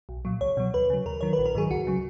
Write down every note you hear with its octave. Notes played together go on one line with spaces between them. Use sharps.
B1
A#2 F#3
C#2 C#5
B2 F#3
D#2 B4
C#3 F#3
D#2 A#4
D#3 F#3 C#5
A#1 B4
A#4
G#2 D#3 F#3 G#4
C#2 F#4
C#3 F#3